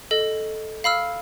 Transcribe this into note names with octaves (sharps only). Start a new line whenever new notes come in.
A4 D#5
F5 B5 E6 F6